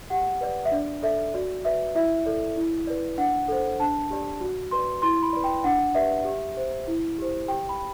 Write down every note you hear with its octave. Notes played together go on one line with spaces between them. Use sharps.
G4 F#5
B4 D5
E5
D4 D5
A4 D5 E5
F#4 D5
B4 D5 E5
E4 E5
A4 D5
E4
B4 D5
D4 F#5
A4 C5
D4 A5
G4 D5
F#4
B4 D5 C6
E4 C6
B5
B4 D5
G5
D4 F#5
G4 B4 D5 E5
G4
C5
E4
G4 C5
G4 G5
B5